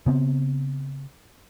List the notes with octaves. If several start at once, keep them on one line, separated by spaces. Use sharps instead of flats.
C#3 B3 C4